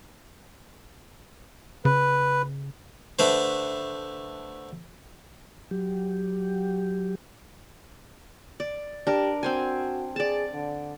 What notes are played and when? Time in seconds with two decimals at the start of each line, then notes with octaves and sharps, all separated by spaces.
1.85 C#3 B4
3.19 D3 A3 B4 C5
5.71 F#3 G4
8.60 D5
9.07 D4 G4 A#4
9.43 C4 F#4 C5 G#5
10.16 G#4 D5 A5
10.53 D3